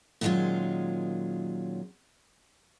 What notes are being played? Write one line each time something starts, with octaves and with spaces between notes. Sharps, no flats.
A#2 D#3 F#3 G#3 C#4 F4